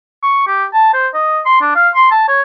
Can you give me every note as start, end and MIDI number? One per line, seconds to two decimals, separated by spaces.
0.23 0.43 85
0.47 0.65 67
0.74 0.92 81
0.94 1.07 72
1.14 1.41 75
1.46 1.60 84
1.61 1.74 62
1.75 1.89 77
1.95 2.08 84
2.11 2.25 81
2.28 2.42 73